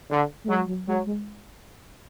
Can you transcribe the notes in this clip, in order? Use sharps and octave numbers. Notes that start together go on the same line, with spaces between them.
D3
A3
F#3 G#3
F#3
F#3 G#3
G#3